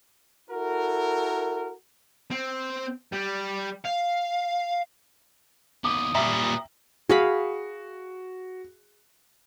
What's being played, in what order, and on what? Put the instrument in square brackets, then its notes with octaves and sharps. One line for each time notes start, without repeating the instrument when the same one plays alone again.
[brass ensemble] E4 F#4 A4 A#4
[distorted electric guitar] C4
G3
F5
[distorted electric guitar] D#2 B3 [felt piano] D6 [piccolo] D#6
[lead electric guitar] A#2 G3 [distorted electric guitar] B4 D5 [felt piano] E5 G5 A#5
[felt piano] F#4 [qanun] G#4 F5 B5